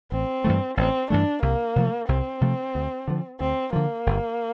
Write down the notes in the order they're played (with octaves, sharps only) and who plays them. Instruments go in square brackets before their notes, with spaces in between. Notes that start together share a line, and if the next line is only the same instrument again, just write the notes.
[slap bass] A1 [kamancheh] C4
[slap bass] G2 E3 A3
[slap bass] A1 [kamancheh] C4
[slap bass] G2 E3 A3 [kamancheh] D4
[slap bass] C2 [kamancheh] A#3
[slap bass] C3 F3 A3
[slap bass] C2 [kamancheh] C4
[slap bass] C3 F3 A3
D2
D3 F3
[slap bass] D2 [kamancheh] C4
[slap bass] D3 F3 [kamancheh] A#3
[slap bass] G1